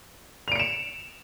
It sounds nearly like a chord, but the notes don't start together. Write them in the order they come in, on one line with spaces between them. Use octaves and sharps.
F7 D7 C#7 E7